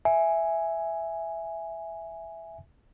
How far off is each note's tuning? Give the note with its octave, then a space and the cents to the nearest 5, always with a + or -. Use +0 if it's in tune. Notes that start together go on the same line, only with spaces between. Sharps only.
E5 +0 G#5 +0